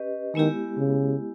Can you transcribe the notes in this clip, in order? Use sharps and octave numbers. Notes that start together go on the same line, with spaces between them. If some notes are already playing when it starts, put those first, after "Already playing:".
Already playing: C#4 G4 B4 D#5
D#3 G#3 B3 E4 G4
C#3